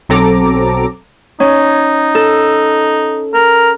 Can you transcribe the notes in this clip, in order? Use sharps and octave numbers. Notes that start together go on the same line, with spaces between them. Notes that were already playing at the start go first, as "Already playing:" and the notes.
B1 F#3 C4 A4 A#5 D6
C#4 D#4
A4
A#4